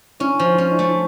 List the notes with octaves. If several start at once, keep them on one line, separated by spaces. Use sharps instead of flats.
C#4 D4 E4
F3
D#4 F4
C#4
D4 E4
A3